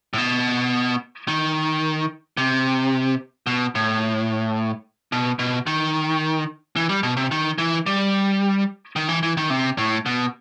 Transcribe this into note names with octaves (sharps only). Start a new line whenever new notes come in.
A2
B2
D#3
C3
B2
A2
B2
B2
D#3
E3
G3
B2
C3
D#3
E3
G3
D#3
E3
E3
D#3
C3
A2
B2